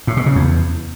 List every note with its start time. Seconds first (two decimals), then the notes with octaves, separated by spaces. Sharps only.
0.07 A2
0.17 B2
0.26 C#3
0.35 E2